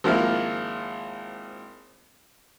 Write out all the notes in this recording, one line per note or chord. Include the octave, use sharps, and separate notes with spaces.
G#1 F3 A#3 E4 F6